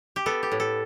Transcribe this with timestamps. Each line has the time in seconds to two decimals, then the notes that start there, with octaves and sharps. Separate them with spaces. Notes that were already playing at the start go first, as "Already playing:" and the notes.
0.16 G4
0.26 B3 A4
0.43 G4
0.52 A2
0.60 A4